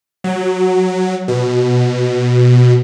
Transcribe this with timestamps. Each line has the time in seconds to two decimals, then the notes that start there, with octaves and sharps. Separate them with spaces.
0.24 F#3
1.28 B2